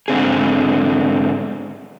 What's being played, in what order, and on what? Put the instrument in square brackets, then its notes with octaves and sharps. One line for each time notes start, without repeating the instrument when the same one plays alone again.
[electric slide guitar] G#2 D3 C4 G#4